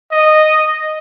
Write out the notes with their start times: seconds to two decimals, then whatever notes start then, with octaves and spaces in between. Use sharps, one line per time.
0.12 D#5